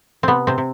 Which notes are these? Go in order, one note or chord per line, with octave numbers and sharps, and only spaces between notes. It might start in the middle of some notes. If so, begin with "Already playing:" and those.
C3 B3 C4
C3 C4
C3